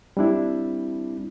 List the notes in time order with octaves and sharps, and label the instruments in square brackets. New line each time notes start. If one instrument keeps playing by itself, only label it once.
[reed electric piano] G3 C4 D4 E4